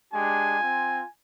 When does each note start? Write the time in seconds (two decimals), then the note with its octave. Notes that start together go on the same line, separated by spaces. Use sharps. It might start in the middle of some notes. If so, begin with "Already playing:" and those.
0.13 G#3 D4 G4 G#5
0.59 C4 F4